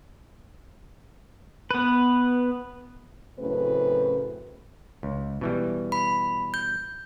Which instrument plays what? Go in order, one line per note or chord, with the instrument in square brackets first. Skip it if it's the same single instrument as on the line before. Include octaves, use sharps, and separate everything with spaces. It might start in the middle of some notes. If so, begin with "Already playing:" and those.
[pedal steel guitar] B3 B4
[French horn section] F#2 A2 C#3 A3 C4 B4
[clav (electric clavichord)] C#2
B2 E3 G3
[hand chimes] B5
G6